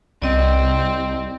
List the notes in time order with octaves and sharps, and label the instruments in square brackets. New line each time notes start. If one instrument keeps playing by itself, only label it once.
[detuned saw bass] C2 [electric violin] C4 [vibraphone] D5 D#5